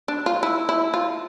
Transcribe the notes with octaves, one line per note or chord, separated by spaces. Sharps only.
D4
F4
E4
E4
F4